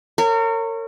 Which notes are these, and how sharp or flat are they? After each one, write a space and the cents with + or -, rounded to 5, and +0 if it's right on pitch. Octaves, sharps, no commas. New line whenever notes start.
A#4 -35 C#5 -10